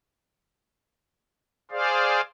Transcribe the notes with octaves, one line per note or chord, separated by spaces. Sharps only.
G#4 C5 D5 F5